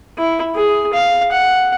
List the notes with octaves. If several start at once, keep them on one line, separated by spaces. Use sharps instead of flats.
E4
G#4
F5
F#5